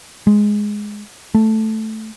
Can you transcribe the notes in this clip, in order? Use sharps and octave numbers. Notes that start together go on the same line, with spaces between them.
G#3
A3